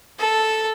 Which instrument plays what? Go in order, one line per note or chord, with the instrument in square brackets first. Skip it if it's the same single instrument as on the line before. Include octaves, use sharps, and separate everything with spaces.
[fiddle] A4